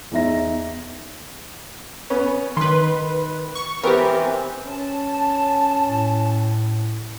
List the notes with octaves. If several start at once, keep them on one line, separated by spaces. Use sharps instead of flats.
E2 D#4 E5 A#6
B3 C#4
D#3 B4 C6
C#6
E3 B3 C4 G4 A#4
C#4 A5
A2